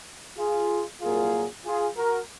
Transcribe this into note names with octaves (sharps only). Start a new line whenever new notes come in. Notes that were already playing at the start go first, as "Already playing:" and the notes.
F4 G#4
C2 A#2 F#3 A#3 F4 G#4
F4 G#4
F#4 A#4